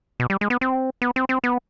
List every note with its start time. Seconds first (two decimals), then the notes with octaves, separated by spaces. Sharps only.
0.20 B2
0.30 G3
0.41 G#3
0.50 B3
0.61 C4
1.02 B3
1.16 C4
1.29 C4
1.44 B3